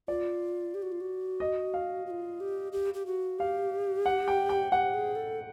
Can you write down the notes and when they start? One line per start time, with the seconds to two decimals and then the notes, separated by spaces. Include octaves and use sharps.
0.08 F4 D5
0.74 G4
0.82 F#4
0.92 F4
1.01 F#4
1.40 D#5
1.74 F5
2.06 F#4
2.10 F4
2.40 G4
2.72 G4
2.94 G4
3.06 F#4
3.39 G4 F5
4.06 F#5
4.28 G5
4.49 G5
4.72 G4 F#5
4.94 G#4
5.16 A4